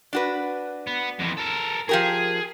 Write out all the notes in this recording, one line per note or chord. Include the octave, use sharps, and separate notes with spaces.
D4 F#4 B4
B3
F2 E3
A4 A#4
F3 G4 G#4 A#4